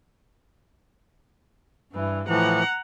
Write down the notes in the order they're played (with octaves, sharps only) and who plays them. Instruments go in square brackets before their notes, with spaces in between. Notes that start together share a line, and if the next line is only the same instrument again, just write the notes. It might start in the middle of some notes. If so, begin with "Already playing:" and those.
[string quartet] G2 E3
[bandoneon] A2 E3 F3 [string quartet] F#5 A#5